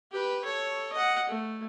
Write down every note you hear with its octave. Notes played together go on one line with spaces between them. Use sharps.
G4 B4
A4 C#5
D#5 F#5
A3